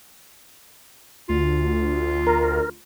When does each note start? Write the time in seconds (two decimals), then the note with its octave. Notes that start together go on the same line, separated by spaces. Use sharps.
1.29 D2 F4
2.27 A#4